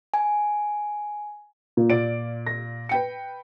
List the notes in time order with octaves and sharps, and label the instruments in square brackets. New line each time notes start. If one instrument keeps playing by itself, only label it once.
[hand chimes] G#5
[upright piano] A#2
[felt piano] A#2 F4 D5 [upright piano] D7
[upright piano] A#6
[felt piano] B4 G5 C#7